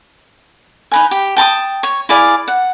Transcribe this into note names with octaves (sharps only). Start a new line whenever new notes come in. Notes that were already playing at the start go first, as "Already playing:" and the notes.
D#4 B4 G#5
G4
G5 A5 B5 D#6
C#5
E4 G#4 D5 F5
F#5